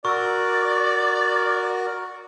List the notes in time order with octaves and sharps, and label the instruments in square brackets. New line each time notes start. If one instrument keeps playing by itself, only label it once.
[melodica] F#4 A#4 [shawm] D5 [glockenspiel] C#6 E6